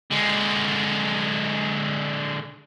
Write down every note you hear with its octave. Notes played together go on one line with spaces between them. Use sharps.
D3 G#3